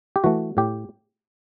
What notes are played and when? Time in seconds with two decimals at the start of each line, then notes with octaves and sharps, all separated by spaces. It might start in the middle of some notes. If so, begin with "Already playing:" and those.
0.16 G4
0.24 E3 A3 F#4
0.57 A2 G4